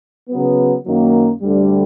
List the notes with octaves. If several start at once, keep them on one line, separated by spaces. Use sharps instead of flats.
C#3 F#3 B3
F#2 D#3 F#3 A#3
D2 D3 G3